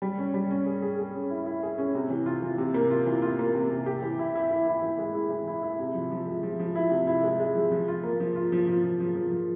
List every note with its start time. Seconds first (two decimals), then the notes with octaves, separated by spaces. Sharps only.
0.02 G3
0.18 C#4
0.34 G3
0.51 C#4
0.66 G#4
0.82 G#4
0.99 G#4
1.14 C#4
1.30 E4
1.46 E4
1.63 G#4
1.78 C#4
1.95 C3
2.10 E3
2.26 F4
2.42 E3
2.58 C3
2.74 A#3
2.91 F4
3.06 E3
3.22 F4
3.39 A#3
3.55 C3
3.70 C3
3.86 G4
4.02 E3
4.19 E4
4.35 E4
4.51 E4
4.68 E4
4.82 E3
4.98 G#3
5.15 E4
5.31 E3
5.48 E4
5.63 E4
5.79 C3
5.95 F3
6.11 F3
6.27 G#3
6.43 F3
6.59 F3
6.75 E4
6.91 C3
7.07 E4
7.24 G#3
7.40 G#3
7.56 F3
7.71 F3
7.88 F4
8.03 A#3
8.20 F3
8.36 F4
8.52 F3
8.68 F3
8.84 F3
9.00 F3
9.15 F3
9.32 F3